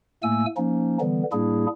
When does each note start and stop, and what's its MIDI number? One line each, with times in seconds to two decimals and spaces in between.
0.23 0.46 45
0.23 0.46 57
0.23 0.46 58
0.23 0.46 80
0.23 0.46 88
0.57 0.98 53
0.57 0.98 58
0.57 0.98 61
0.57 0.98 63
1.00 1.23 50
1.00 1.23 52
1.00 1.23 55
1.00 1.23 59
1.32 1.66 45
1.32 1.66 55
1.32 1.66 58
1.32 1.66 62
1.32 1.66 64
1.32 1.66 68